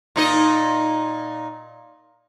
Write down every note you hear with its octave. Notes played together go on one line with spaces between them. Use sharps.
A#2 D#4 D#5